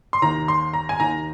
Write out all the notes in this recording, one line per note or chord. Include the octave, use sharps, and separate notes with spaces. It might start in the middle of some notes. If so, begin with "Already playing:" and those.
C6
D#2 D#3 A#5
C6
A#5
G#5
D#2 D#3 A#5